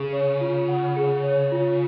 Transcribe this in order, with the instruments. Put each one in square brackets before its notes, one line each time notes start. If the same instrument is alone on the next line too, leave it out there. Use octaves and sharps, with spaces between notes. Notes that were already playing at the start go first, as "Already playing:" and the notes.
Already playing: [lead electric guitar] C#3 [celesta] G#4
[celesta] C#5
F4
F#5
G#4
C#5
F4